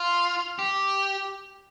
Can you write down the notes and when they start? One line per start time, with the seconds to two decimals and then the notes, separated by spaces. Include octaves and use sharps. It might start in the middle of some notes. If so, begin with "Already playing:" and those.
Already playing: F4
0.59 G4